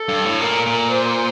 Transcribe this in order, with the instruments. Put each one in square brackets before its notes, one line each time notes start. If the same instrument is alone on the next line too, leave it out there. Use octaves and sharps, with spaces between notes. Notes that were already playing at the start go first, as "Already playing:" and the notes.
Already playing: [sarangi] A4
[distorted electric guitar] G2
A2
[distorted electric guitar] A#2 [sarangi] A#4
[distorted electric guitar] A#2
[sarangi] C5